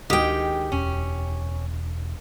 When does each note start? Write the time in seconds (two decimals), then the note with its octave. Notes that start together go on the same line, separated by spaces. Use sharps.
0.10 D2 D#3 G#3 F#4 G4 G5 D#6
0.72 E1 C#4